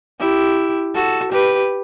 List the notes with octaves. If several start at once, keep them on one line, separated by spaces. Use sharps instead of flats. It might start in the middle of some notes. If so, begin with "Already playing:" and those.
E4 G4
F#4 A4
G4 B4